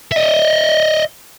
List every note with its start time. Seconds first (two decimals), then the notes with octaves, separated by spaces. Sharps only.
0.12 D#5 E5